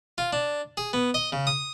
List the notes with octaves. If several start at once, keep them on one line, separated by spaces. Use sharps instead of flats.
F4
D4
G#4
B3
D#5
C#3
D#6